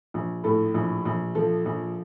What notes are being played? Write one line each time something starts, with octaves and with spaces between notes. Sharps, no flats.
A#1
A2 A4
A#1
A#1
F3 A4
A#1